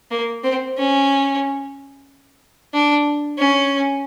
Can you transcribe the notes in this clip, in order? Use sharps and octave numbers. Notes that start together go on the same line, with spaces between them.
A#3
C4
C#4
D4
C#4